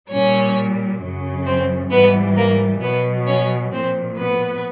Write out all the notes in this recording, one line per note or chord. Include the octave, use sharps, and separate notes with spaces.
A#2 G3 C#4 C#5
F#2 C#3 F#3
C4 C5
G#2 E3 G3 B3 B4
A#3 A#4
B2 F#3 B3 B4
C#4 C#5
A#2 F3 C4 C5
B3 B4